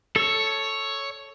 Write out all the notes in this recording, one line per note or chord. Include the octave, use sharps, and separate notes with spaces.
A4 C#5 E6